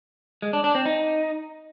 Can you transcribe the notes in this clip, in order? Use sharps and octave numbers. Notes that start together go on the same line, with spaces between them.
G#3
D4
D4
C4
D#4